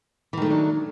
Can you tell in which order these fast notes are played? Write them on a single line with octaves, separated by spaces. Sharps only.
E3 D#3 A3 F#3 D4